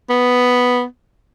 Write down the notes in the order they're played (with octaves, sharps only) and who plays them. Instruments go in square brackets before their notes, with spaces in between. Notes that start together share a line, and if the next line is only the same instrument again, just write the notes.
[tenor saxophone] B3